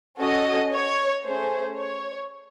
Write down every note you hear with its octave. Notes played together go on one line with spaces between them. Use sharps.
C#4 F#4 A4 D#5
C#5
A3 C#4 G#4 C5
C#5